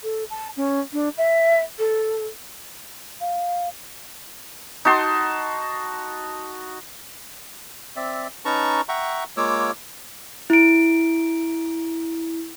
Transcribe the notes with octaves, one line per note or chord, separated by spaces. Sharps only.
A4
A5
C#4
D4
E5
A4
F5
D#4 F#4 A5 C6
C4 D5 E5
C#4 D#4 B4 A5 A#5 C#6
E5 F#5 G5 A#5 C#6
G#3 A#3 F4 C#5 D6 E6
E4 D7